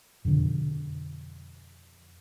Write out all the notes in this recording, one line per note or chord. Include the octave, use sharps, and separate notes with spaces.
F2 B2 D3 F3